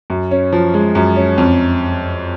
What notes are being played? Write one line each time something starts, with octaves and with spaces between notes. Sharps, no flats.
F#2
C#4
F3
G#3
F#2
C#4
F2